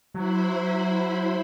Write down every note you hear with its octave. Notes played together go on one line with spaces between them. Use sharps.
F#3 E4 C5 B5